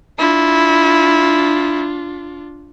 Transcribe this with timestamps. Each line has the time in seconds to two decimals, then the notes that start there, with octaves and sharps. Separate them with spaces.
0.19 D4 E4 F4